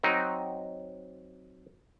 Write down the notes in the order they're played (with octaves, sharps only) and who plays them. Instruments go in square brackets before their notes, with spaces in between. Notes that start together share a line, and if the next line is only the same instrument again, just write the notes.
[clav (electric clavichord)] F#3 C4 D#4